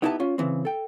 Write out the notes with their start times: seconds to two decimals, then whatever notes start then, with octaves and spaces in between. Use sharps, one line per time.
0.02 B3 D#4 E4 G4 F5 A5
0.20 C#4 F4
0.38 C#3 E3 C4
0.65 A4 G5